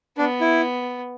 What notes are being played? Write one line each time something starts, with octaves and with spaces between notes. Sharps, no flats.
B3 D4
E4